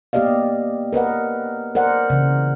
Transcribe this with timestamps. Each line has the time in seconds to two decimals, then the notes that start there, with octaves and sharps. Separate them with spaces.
0.13 A#3 B3 G4 D5 D#5 F5
0.93 A#4 B4 D#5 F#5
1.75 A#4 C5 D5 F#5
2.10 C#3 E3